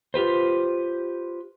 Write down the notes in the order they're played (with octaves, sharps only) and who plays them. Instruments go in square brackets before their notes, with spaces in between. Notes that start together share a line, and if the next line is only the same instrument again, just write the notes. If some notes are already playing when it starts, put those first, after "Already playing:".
[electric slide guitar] F4 G4 B4 C5